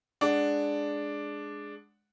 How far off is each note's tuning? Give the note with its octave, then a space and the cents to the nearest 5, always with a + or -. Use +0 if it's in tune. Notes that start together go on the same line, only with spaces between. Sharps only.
G#3 +0 D4 +0 F#5 +0